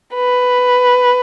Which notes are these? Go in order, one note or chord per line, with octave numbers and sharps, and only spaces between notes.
B4